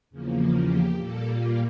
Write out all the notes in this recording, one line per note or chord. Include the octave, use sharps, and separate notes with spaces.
E2 C#3 F3 A#3
G4
A#2 G3 A#3 A4
F4